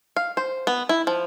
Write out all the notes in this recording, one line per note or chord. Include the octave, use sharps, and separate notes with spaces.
F5
C5
B3
E4
F3